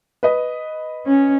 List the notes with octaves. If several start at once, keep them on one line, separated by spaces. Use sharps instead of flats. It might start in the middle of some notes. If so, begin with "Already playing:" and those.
B4 D#5
C#4